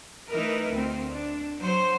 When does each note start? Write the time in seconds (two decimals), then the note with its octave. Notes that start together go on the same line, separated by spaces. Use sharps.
0.29 E3 A3 D#4 E4 A#4 B4
0.72 D2 C4
1.11 D4
1.57 F#3 C5